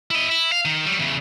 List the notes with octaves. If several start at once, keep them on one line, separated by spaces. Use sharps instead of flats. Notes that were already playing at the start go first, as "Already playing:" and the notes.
E4 D#5
E4
F5
D#3
F#3 G3
E2 C#3